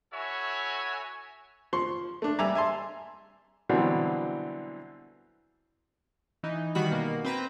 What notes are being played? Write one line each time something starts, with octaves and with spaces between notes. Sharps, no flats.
E4 F#4 A4 C#5 E5 G#5
F3 C6 C#6
A3 D4
G3 E5 G#5 A#5 D6
E5 G#5 A5 C6
B2 D3 E3 F#3 G3 C4
E3 D#4
D#3 G3 F#4 B5
B2 A#3
C4 B4 A#5